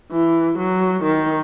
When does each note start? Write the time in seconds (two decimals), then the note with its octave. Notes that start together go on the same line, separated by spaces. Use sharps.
0.12 E3
0.58 F#3
1.04 D#3